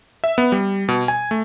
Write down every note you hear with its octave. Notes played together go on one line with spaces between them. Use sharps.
E5
B3
G3
B2
G#5
A3